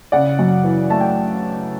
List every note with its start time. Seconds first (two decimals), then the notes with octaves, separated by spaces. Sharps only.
0.12 C#3 D5 F#5
0.39 F#2
0.64 E3
0.90 A3 A5
1.00 G5